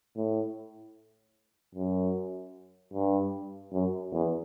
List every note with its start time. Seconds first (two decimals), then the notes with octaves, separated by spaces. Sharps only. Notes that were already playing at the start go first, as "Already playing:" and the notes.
0.16 A2
1.75 F#2
2.94 G2
3.72 F#2
4.13 E2